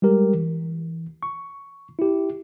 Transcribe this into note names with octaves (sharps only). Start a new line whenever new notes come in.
G3 G#3 G4 A#4
E3
C#6
E4 G4